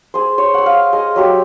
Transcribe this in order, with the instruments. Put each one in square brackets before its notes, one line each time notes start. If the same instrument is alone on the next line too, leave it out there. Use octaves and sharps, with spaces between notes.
[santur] G#4 C5
C5 C#5
F#5 E6
F5
G#4 D#5
F#3 G4 E6